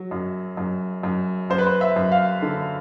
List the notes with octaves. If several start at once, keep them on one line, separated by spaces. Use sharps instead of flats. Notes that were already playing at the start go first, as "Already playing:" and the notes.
Already playing: F#3
F#2
F#2
F#2
F#2 C5
B4
C5
E5
F#2
F5
D3